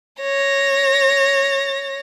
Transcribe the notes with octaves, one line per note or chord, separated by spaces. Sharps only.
C#5 A#6